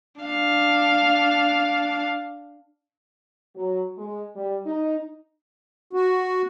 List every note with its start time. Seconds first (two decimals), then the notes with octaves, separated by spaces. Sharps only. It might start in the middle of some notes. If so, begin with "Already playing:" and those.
0.22 D4 F5
3.55 F#3
3.96 G#3
4.36 G3
4.66 D#4
5.93 F#4